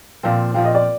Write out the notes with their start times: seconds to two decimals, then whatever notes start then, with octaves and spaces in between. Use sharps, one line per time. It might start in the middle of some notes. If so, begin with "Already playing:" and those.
0.23 A#2 F3 C4 F5
0.54 A#2 F3 C4 F5
0.65 D#5
0.75 D5